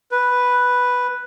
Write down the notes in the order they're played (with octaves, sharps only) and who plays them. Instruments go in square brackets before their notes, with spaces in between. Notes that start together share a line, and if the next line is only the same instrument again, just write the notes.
[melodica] B4